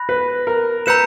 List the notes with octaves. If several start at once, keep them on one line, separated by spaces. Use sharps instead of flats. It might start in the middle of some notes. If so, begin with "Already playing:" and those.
Already playing: B5 F#6 A#6
B4
A#4
B4 A#5 E6 G6 C#7 E7